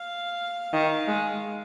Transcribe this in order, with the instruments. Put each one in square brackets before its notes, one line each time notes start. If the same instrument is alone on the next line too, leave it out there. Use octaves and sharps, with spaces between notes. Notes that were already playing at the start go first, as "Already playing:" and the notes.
Already playing: [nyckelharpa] F5
[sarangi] D#3
G#3